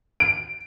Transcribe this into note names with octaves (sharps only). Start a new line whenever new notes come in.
D7